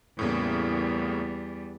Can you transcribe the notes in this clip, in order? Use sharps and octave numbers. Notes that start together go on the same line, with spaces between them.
E2 A2 C#3 G3 A#3